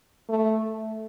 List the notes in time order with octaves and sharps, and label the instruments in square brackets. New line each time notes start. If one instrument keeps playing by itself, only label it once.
[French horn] A3